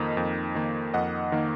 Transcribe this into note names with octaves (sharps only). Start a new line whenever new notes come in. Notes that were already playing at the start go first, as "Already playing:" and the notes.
Already playing: F2 D#3 A#3 D#5
F2
D#3 A#3
F2 D#5 F#5
D#3 A#3